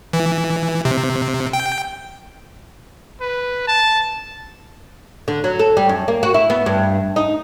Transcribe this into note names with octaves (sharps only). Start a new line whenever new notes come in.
E3
C3
G5
B4
A5
D3
F#3
A4
G3
F#2
A#3
F#4
E4
B3
G2
D#4